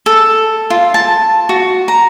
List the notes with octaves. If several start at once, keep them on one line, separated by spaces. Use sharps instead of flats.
A4
F4
A5
F#4
A#5